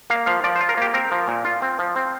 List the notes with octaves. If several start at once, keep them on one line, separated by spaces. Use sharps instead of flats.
A#3 F5
F3 F5
F3 D5
C5
F4
A#4
A#3 G4
C4 A#4
F3
A#2
F4
C4
F3
C4